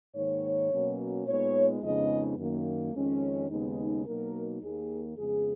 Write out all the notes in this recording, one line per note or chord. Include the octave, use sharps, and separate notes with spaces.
G#2 D#3 A#3 C#5
B2 F#3 A#3 C#4
A#2 G#3 B3 D#4 C#5
F2 C#3 G#3 B3 D#4 D#5
F#2 D#3 A#3
F2 D#3 G#3 C#4
D#2 C#3 G#3 B3 D#4
B2 F#3 A#3 D#4 A#4
D#2 D#3 A#3 G#4
F2 C#3 G#3 B3 G#4